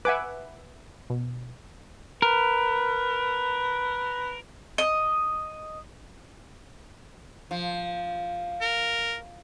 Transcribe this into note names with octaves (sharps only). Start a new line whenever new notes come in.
B4 E5 F#5 G#5 D6
B2
A#4 B4
D#5
F3
A#4